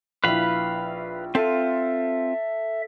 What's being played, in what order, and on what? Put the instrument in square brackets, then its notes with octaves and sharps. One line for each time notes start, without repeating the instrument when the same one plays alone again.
[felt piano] A#1 E4 [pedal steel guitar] B4 F5 B5
[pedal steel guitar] C4 F4 [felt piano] A4 [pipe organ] E5